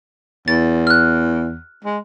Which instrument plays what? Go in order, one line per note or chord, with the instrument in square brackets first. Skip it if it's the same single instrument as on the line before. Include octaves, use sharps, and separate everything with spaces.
[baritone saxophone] E2 [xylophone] A6
[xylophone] F6 F#6
[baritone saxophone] G#3